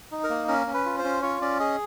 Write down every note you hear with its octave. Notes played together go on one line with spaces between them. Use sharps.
D#4
A#4
A#3
C#4 A#4
C#4
B4
F4
C5
C#4
F4 C#5
C#4 D5
G#4 D#5